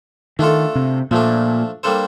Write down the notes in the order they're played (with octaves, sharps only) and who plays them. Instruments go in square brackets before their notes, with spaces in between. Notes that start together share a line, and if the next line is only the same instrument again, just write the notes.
[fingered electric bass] D#3 [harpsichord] A3 D4 F4 A4
[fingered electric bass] C3
[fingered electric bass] A#2 [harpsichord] F3 A3 D4
[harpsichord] G3 A#3 D4 A4 C5